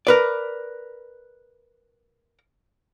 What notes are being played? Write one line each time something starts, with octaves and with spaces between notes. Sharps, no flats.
A#4 B4 D5